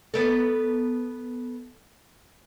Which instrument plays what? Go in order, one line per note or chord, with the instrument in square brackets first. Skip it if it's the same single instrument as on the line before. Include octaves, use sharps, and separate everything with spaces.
[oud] B3 A4